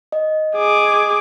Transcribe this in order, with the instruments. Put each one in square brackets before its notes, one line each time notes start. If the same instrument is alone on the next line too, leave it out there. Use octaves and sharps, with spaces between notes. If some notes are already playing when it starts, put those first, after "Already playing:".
[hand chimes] D#5
[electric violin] G#4 D6